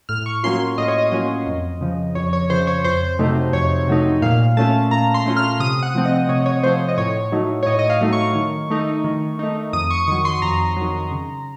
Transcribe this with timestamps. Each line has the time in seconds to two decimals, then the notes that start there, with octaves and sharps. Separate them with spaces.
0.09 A2 F6
0.26 C#6
0.44 F#3 A#3 C#4 F4 C6
0.78 A2 D#5
0.88 C#5
0.98 D#5
1.12 F#3 A#3 C#4 F4
1.47 F2
1.81 C#3 F3
2.15 F2 C#5
2.33 C#5
2.50 C#3 F3 C5
2.62 C5
2.67 C#5
2.84 F2 C5
3.19 C3 F#3 A3 D#4
3.53 F2 C#5
3.87 C3 F#3 A3 D#4
4.22 A#2 F5
4.57 A3 C#4 F4 A5
4.91 A#2 A#5
5.14 C6
5.26 A3 C#4 F4
5.37 F6
5.60 C3 D#6
5.83 F#5
5.95 F3 A3 C4
6.06 D#5
6.29 C3 C#5
6.40 D#5
6.46 C#5
6.63 F3 A3 C4 C5
6.88 D#5
6.98 A2 C#5
7.32 F#3 A3 D#4
7.63 C#5
7.67 A2 D#5
7.79 D#5
7.90 F5
8.01 F#3 A3 D#4
8.13 C#6
8.35 D#3
8.70 A3 D#4
9.04 D#3
9.39 A3 D#4
9.73 F2 D#6
9.91 C#6
10.08 D#3 F#3 C#6
10.25 C6
10.42 F2 A#5
10.77 D#3 F#3
11.11 C#3